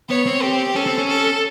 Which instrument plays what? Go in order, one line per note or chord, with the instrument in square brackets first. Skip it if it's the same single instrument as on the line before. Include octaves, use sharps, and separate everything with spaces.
[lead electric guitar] B3 [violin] C#5
[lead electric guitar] C4
[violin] G4
[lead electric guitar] C#4 [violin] A4
[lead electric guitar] C4
C#4
[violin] A4